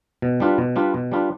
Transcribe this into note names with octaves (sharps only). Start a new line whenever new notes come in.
B2
G3 D4 F4 B4
B2
G3 D4 F4 B4
B2
G3 D4 F4 B4